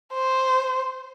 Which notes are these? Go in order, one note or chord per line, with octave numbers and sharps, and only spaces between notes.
C5